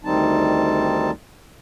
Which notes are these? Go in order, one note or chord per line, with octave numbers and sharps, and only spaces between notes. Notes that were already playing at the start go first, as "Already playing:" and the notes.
D2 D#3 G3 C4 D#4 A5